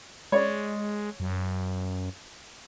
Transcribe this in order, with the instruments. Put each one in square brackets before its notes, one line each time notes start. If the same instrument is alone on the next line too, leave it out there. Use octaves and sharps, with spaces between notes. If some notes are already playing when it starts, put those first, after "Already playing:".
[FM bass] G#3 [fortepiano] C#5 D5
[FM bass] F#2